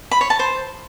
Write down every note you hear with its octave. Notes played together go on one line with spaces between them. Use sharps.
B5
C#5
A5
C5